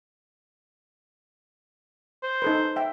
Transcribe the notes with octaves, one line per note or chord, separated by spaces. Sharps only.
C5
D#4 A4 B4
E5 G5